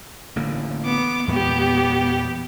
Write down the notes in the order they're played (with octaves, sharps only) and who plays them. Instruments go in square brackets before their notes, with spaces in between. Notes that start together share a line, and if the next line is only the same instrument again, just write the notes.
[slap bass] A1 D3 A#3
[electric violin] B3 D6
[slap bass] E2 A#2 G#3 [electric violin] B3 G4